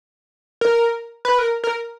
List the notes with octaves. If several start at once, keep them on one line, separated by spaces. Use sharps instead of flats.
A#4
B4
A#4
A#4